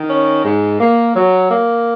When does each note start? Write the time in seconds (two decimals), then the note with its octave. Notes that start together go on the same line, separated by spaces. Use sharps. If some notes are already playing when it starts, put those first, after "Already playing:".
Already playing: D#3
0.08 C#4
0.44 G#2
0.80 A#3
1.15 F#3
1.50 A#3